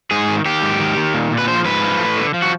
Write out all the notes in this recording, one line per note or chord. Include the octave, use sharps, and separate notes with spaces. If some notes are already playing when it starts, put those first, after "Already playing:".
G#2 G#4
D#3
D#3 G4
G#2
D#3
D#3
A#2
A#2
B4
F3 C5
G#2 B4
F3
A2
D3
F3
F#4